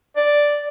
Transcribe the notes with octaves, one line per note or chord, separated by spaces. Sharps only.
D5